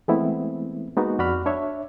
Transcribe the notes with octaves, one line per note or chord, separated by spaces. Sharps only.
E3 G#3 A3 B3 C4 E4
G#3 A#3 B3 D#4 F#4
F2 F#4 D5 B5 F6
D4 C#5 E5